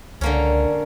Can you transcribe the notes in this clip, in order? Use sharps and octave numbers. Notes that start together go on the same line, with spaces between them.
C#2 D3 A#3 C#4